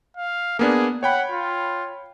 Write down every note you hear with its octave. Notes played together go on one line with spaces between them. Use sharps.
F5
A#3 B3 D4 G#4
C#5 F#5 G5 B5
F4